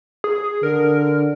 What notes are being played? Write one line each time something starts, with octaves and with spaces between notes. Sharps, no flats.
G#4
D3 A#4